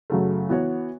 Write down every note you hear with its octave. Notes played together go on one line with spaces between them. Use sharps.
F#2 C#3 F#3 A3
E3 B3 F#4 C#5